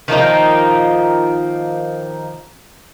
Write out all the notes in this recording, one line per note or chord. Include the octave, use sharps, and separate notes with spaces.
D#3 F3 A#3 D#4